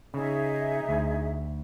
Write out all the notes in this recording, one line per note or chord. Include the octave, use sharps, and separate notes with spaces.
C#3 D#4 G#4 E5
D2